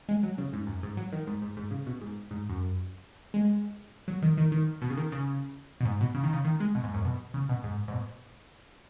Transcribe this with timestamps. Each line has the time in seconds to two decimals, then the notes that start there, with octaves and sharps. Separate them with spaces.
0.09 G#3
0.23 F#3
0.38 C#3
0.53 G#2
0.67 F#2
0.83 G#2
0.97 F#3
1.12 D#3
1.27 G#2
1.42 G#2
1.57 G#2
1.71 C#3
1.86 B2
2.01 G#2
2.31 G#2
2.49 F#2
3.34 G#3
4.08 F#3
4.22 D#3
4.37 D#3
4.52 D#3
4.82 B2
4.90 C#3
4.97 D#3
5.12 C#3
5.81 B2
5.85 G#2
6.01 B2
6.15 C#3
6.24 D#3
6.33 C#3
6.45 D#3
6.60 G#3
6.75 B2
6.84 G#2
6.94 F#2
7.05 B2
7.34 C#3
7.49 B2
7.64 G#2
7.88 G#2
7.92 B2